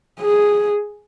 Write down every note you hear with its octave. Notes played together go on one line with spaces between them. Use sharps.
G#4